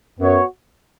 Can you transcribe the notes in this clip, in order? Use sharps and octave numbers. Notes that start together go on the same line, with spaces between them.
F#2 B3 F#4 C#5